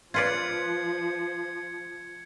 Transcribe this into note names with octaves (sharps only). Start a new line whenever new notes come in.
F3 F4 B4 D5 G#6 C#7